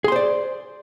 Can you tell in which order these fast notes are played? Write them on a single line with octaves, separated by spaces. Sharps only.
G#4 C6 C5 D5